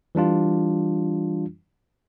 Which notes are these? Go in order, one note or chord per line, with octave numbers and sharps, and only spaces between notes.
E3 G3 D4 F4